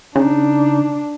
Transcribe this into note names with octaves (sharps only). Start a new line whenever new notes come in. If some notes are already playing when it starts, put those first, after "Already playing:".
C#3 D4 D#4